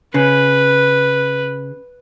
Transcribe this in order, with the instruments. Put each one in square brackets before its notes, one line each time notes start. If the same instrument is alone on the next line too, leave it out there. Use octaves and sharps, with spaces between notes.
[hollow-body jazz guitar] C#3 [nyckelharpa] B4